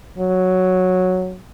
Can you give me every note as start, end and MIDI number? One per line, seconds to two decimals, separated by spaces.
0.18 1.38 54